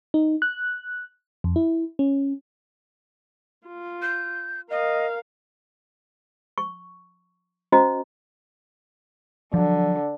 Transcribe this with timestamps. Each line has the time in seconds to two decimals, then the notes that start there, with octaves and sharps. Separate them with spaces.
0.14 D#4
0.42 F#6
1.44 F2
1.56 E4
1.99 C#4
3.68 F4
4.02 G6
4.70 A#4 D#5 F5
6.58 C#6
7.72 C#4 F#4 C5 D#5 A#5
9.54 D3 F3 F#3